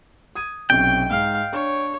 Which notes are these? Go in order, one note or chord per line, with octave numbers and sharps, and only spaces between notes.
D#6 G#6 D#7
B1 C3 C#4 G5
G#2 F5
D4 C#5